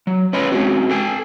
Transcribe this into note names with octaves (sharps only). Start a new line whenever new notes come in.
F#3
C#4 B4 C#5 D#5 B5 C6
G#3 A#3 C4 C#4 F#4
A4 G5 G#5